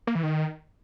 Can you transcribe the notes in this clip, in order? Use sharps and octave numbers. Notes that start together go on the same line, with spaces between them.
A#3
E3
D#3